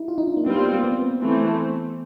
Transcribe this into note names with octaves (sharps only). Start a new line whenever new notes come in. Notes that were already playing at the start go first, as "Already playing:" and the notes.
Already playing: D#4 E4
F4
D#4
D4
A#3
G3 B3 C4 F4
A#3
B3
A#3
B3
C4
B3
E3 A3 C4
B3